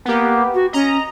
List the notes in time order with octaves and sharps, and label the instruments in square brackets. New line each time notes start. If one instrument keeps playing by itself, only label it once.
[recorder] A#3 [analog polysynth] B3 G4
[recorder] F#4
[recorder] C#4 [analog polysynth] D#5 A#5